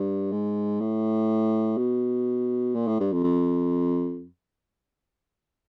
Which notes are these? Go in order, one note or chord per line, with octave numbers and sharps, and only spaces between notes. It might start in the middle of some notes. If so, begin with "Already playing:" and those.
Already playing: G2
G#2
A2
B2
A#2
A2
G2
F2
F2